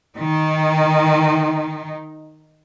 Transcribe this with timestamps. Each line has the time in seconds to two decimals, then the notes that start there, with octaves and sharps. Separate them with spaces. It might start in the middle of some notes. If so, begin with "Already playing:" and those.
0.18 D#3 D#4